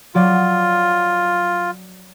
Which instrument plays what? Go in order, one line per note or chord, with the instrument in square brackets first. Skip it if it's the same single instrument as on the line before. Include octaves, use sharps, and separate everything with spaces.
[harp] F#3 D5 [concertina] F4